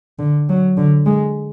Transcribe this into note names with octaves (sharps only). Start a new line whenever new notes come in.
D3
F#3
D3
G#3